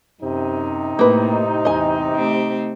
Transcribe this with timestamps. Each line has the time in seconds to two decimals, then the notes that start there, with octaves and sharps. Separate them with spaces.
0.22 F#2 C3 D#4
0.99 A2 A#3 B4
1.65 E2 D#5 G#5
2.15 A3 C4 G4